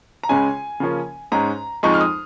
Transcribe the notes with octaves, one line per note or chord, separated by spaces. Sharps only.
A#5
C#2 C#3 G#3 C#4 G#5
C#3 F3 A#3 C#4
G#2 G#3 C#4 A#5
F2 F3 G#3 D#4 C#6
F6
D#6